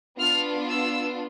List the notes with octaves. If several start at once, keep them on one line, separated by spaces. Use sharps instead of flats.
B3 D4 F4 F6
E6